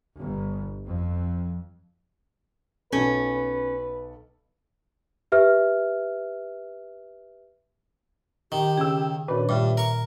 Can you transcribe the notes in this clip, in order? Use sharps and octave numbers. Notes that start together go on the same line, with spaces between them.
G1
F2
B1 C#4 A4 B4
G4 B4 E5 F6
D#3 G4
C#3 G#4 G5 E6
A#2 D#3 C#4 D4 F#4 B4
G2 A#2 F4 E5
A#4 C#6